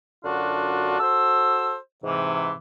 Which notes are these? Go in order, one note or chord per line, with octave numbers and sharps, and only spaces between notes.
F#2 D3 D4 F4 F#4 A5
F#4 A4 C5 E6
G#2 C3 E3